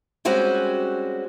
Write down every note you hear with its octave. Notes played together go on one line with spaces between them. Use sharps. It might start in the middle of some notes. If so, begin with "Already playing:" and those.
G3 G#3 C4 C#4 F#4 G#4